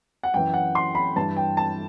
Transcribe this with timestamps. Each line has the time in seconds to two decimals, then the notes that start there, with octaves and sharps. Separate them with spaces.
0.23 F#5
0.34 F#2 E3 G5
0.54 F#5
0.75 C6
0.95 B5
1.16 G2 E3 A5
1.37 G5
1.57 A5